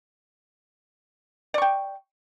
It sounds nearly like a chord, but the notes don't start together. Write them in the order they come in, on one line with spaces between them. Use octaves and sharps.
D5 C#6 G5